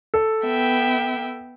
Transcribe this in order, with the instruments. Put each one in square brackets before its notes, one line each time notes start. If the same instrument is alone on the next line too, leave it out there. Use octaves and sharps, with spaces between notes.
[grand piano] A4
[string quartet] B3 E5 G5